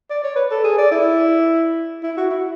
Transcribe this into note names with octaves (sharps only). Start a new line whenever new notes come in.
D5
C#5
B4
A4
G#4
D5
E4
E4
F#4
E4